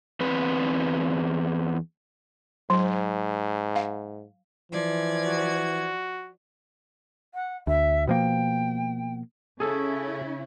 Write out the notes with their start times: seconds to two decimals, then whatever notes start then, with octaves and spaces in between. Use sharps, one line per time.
0.20 E2 C4 B4
2.70 G#2 F#3
3.76 F5
4.72 E3 F3 D5 G#6
5.26 F#4
7.34 F#5
7.67 D2 E5
8.07 B2 F3 A#3 G5
9.60 C#3 C#4 E4 G#4 A4